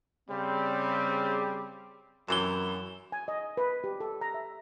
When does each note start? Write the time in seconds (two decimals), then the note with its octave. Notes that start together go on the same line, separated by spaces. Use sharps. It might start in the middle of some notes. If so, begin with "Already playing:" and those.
0.30 C#3 G3 C4
2.28 F#2 C3 E3 E7 G7
3.12 G#5
3.28 D#5
3.57 B4
3.84 G4
4.00 A4
4.21 A#5
4.34 E5